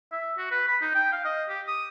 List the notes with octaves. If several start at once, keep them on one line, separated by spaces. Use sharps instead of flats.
E5
F#4
B4
B5
D#4
G5
F5
D#5
G4
D#6